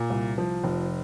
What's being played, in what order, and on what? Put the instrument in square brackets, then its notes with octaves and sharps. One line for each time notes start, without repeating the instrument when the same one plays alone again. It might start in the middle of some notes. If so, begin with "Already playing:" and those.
Already playing: [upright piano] A#2
C2
F3
F1